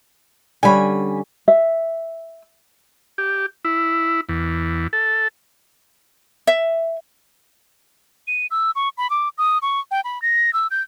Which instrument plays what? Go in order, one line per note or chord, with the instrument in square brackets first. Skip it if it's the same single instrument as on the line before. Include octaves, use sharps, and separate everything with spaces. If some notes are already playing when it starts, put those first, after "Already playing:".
[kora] D3 G3 C#4 [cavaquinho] G#5 B5
[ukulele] E5
[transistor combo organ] G4
E4
E2
A4
[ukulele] E5
[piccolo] D#7
E6
C#6
B5
D6
D#6
C#6
G5
B5
A#6
E6
G6